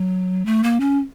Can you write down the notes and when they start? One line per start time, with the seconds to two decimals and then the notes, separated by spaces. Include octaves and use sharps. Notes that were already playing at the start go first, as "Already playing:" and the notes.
Already playing: F#3
0.46 A3
0.63 A#3
0.80 C#4